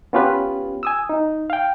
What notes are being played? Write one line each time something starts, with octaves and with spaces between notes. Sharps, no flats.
B3 C#4 F4 G4 B4
G#5 D#6 E6
D#4
F5 G5